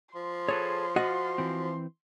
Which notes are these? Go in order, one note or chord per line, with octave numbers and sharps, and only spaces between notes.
F3 C6
G#4 A4 B4 C#5
F4 F#4 D#5 F#5
E3 C4